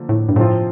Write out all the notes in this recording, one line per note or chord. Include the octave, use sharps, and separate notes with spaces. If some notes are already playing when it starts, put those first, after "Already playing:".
Already playing: D3 F3 A#3
A2
G2
A2 C3 F3 C4 F4